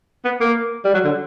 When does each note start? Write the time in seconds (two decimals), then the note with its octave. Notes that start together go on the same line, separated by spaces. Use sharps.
0.25 B3
0.40 A#3
0.84 G3
0.94 F#3
1.05 D3